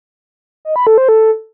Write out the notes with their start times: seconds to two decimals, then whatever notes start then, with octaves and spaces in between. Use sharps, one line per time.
0.65 D#5
0.76 B5
0.87 A4
0.98 C5
1.09 A4